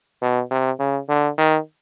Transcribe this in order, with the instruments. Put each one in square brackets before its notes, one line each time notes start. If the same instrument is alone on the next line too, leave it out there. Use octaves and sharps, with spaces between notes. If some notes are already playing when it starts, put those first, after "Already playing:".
[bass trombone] B2
C3
C#3
D3
D#3